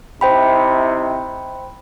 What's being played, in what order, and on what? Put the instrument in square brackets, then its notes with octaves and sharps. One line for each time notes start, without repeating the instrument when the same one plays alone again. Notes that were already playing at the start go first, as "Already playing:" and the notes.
[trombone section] C3 D#4 E4 [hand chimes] C5 G5 B5